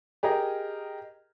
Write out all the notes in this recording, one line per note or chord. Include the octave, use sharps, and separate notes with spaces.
G4 G#4 A#4 D#5